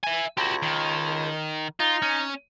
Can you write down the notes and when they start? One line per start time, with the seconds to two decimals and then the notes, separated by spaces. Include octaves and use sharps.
0.03 E5 G#5
0.37 C#2 F#4 G4
0.63 D#3
1.80 D#4 F4
2.02 C#4